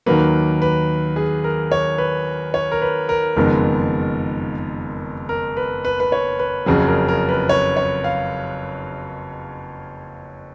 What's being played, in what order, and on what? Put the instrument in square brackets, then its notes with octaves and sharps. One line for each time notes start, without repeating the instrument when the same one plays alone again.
[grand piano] D#2 D#3 F#3 A#3 B4
B4
G#4
A#4
C#5
B4
C#5
A#4
B4
A#4
F#1 F2 D#3 G#3 B3
A#4
B4
B4
B4
C#5
B4
F#1 F2 C#3 F#3 G#4
A#4
A#4
B4
C#5
C#5
F5